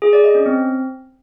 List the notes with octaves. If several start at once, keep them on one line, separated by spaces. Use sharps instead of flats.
G#4
D5
D#5
C#4
C4